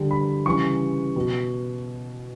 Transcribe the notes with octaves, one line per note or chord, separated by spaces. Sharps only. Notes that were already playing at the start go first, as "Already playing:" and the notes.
Already playing: D3 G3
B5
C#3 E3 G3 C#6
B2